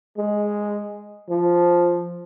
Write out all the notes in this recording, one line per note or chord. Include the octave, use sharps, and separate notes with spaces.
G#3
F3